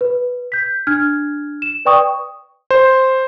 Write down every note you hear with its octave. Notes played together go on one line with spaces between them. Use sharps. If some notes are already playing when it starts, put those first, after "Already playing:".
B4
G6 B6
D4 F6 G#6
E7
B4 D5 G5 C#6 D#6
C5